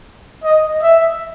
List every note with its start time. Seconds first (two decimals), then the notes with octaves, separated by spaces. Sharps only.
0.44 D#5
0.83 E5